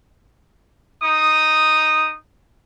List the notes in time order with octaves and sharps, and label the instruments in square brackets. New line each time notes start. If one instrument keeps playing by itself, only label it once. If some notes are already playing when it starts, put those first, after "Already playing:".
[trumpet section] D#4 D#6